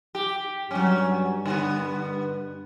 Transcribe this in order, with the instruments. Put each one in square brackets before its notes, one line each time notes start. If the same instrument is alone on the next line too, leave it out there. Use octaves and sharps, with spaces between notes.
[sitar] G4
[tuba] G2 [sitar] F#3 C#4
[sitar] D3 B3